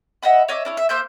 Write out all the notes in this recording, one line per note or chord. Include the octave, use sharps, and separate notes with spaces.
D#5 E5 F#5 B5
C#5 D#5 E5 D6
D4 E4 C#5
E5
A#3 C5 E5 G6